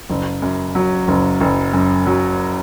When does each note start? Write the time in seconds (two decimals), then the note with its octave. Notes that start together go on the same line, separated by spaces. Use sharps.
0.10 F#1
0.42 F#2
0.75 F#3
1.08 F#1
1.41 F#1
1.73 F#2
2.06 F#3